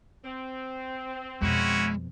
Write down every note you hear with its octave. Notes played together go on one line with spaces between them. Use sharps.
C4
F2 B2 G#3 C#4 E4 F#4